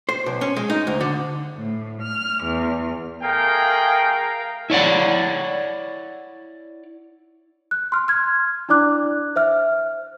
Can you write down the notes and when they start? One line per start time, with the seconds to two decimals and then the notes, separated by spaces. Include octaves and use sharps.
0.09 C5
0.26 B1
0.41 C#4
0.56 G#3
0.70 D#4
0.87 D2
1.01 D3
1.56 A2
2.02 F6
2.44 E2
3.22 A3 G#4 A#4 F5 G5
4.70 E4 C#5 D5 F#5
7.71 F#6
7.92 C6 F6
8.08 F6 G#6
8.69 D4 E4 D5 D6 F#6
9.36 C5 E5 F6